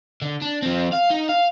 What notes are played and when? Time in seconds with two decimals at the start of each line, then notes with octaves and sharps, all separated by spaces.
0.22 D3
0.42 D4
0.62 F3 C4
0.93 F5
1.10 D#4
1.29 F5